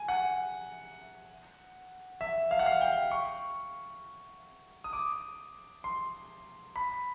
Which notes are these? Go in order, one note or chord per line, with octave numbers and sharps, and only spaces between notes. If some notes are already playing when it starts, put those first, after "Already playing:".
Already playing: G#5
F#5
E5
F5
F#5
F5
G5
C#6
D#6
D6
C6
B5